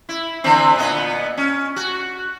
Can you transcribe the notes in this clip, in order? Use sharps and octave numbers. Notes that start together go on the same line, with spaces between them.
E4
D3 E3 C4
A#2 B3 D#5
C#4
F#4